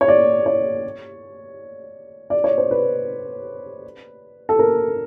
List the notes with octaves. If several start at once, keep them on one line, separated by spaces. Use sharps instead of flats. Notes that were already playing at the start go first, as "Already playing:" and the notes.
C#5
D5
C#5
D5
C#5
C5
B4
A4
A#4